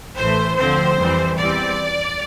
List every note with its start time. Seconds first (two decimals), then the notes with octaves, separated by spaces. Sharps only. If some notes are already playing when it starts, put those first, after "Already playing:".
0.17 A1 A2 E3 A3 C5
0.57 D2 D3 F3 C4 C5
0.98 F2 E3 G3 C4
1.38 E2 E3 G3 C4 D5